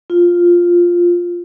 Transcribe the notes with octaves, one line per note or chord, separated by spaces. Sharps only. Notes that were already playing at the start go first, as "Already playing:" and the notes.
F4